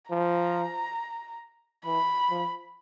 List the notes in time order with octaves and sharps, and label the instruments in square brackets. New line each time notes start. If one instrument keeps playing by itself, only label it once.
[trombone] F3 [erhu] A#5
[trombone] E3 [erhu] B5
[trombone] F3